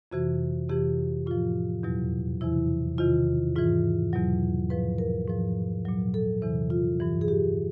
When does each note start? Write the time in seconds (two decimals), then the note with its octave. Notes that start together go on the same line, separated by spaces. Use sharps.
0.12 F2 C3 E3 F#4
0.69 F2 C3 E3 G4
1.26 A2 F3 F4
1.83 E2 B2 F#3
2.41 E2 C3 E3 E4
2.98 E2 C3 D#3 F4
3.56 G#2 E3 F4
4.13 E2 B2 F#3
4.70 G#2 F3 B4
4.98 A#4
5.28 G#2 F3
5.85 A#2 F#3
6.14 A4
6.42 E2 C3 E3
6.70 F4
7.00 G2 E3
7.21 G#4
7.28 G4